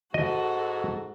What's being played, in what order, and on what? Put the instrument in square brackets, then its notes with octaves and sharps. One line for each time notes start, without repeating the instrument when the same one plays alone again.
[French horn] G#2 [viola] F#4 A4 [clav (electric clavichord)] D#5